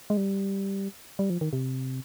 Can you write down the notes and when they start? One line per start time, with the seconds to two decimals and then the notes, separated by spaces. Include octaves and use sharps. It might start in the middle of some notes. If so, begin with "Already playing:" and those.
0.10 G#3
0.17 G3
1.19 G3
1.30 F3
1.41 D#3
1.53 C3